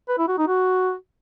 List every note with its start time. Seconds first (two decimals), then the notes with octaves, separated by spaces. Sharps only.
0.09 B4
0.18 E4
0.28 F#4
0.38 D#4
0.48 F#4